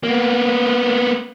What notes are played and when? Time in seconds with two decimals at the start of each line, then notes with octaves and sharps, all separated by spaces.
0.04 A#3 B3